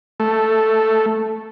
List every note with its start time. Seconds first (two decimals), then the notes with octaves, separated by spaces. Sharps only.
0.20 A3